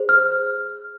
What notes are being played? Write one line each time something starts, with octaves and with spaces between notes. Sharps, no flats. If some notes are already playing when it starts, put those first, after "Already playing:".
Already playing: G#4 C5
F6